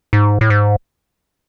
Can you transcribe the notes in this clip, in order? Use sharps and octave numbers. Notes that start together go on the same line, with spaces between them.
G#2
A2
G#2